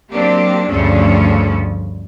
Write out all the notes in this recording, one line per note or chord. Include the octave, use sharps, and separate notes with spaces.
F#3 A#3 C4 D4 G4
D2 G2 C#3 F3 A3 C#4